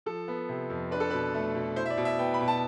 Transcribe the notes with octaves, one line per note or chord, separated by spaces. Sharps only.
F3 A4
B3
C3
F2
D4 B4
A4
B2 B4
A3
B2
E4 C5
E5
D5
B2
E5
B3 G5
B5
B2
A5